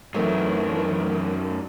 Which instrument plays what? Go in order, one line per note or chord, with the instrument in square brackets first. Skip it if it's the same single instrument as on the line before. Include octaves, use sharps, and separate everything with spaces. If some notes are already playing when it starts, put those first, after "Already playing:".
[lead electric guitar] F#2 D#4 [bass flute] E3 [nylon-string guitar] F#3 A3 C4 [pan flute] A#4